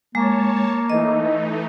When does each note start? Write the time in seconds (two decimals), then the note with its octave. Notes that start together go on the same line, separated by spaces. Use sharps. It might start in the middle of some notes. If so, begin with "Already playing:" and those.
0.15 G#3 A#3 C#5 A5
0.90 E3 A3 D#4 D#5